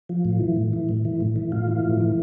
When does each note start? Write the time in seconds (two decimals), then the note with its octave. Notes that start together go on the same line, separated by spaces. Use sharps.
0.09 F3
0.25 A2
0.41 E3
0.56 A2
0.73 E3
0.89 A2
1.05 E3
1.21 A2
1.36 E3
1.52 A2 F4
1.68 E3
1.85 A2
2.01 E3